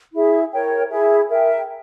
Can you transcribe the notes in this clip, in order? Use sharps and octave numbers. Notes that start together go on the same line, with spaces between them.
E4 G#4 E5
A#4 C#5 G5
E4 G#4 E5
A#4 E5 G5